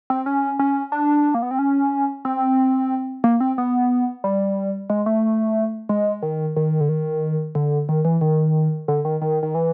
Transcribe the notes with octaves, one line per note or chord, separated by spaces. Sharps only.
C4
C#4
C#4
D4
A#3
B3
C4
C#4
C4
A#3
C4
B3
G3
G#3
A3
G#3
D#3
D#3
D3
D#3
D3
D#3
E3
D#3
D3
D#3
D#3
D#3
E3